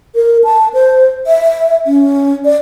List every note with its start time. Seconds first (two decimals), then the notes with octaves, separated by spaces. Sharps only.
0.15 A#4
0.44 A5
0.74 C5
1.27 E5
1.87 C#4
2.45 D5